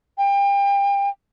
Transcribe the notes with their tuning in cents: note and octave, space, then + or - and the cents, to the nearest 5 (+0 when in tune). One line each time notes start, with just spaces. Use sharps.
G5 +35